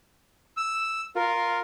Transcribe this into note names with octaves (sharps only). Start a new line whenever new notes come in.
E6
F4 A#4